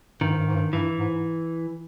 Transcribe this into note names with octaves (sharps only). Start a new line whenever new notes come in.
G2 D#3
G#2
G2
G#2
G2
G2 E3
G#2